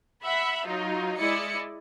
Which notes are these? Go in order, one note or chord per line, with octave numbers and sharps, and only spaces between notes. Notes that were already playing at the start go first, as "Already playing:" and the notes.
E5 F#5 B5
F#3 D#4 F4
G#3 E4 D5 D#5 C#7